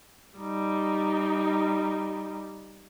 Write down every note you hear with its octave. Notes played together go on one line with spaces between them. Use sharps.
G3 D#4